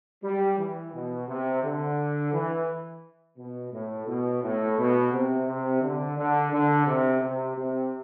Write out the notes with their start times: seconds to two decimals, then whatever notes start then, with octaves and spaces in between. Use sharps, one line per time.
0.23 G3
0.58 E3
0.93 B2
1.27 C3
1.63 D3
2.33 E3
3.38 B2
3.72 A2
4.07 B2
4.43 A2
4.78 B2
5.12 C3
5.47 C3
5.82 D3
6.17 D3
6.52 D3
6.86 C3
7.22 C3
7.57 C3